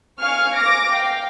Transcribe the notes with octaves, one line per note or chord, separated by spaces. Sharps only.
F5 G#5 C#6 F6
D6 A#6 D7
F5 G5